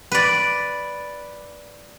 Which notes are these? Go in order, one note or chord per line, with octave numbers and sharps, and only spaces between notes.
B4 D5